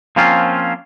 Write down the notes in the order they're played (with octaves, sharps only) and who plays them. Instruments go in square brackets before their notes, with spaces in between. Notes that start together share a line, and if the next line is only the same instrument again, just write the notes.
[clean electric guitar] F3 A#3 C4 C#4 F4